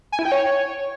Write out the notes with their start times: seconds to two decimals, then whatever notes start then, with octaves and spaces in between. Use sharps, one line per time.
0.12 G#5
0.19 E4
0.25 G5
0.32 C#5